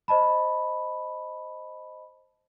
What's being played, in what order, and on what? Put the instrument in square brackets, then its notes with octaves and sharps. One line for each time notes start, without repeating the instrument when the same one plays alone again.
[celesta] C5 D#5 A5 B5